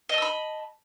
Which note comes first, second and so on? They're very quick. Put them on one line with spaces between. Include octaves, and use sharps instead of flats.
D#5 A5 E6 B5